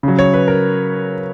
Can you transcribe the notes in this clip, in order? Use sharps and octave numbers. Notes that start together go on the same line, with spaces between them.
C#3 F#3
C#5
B4
A#4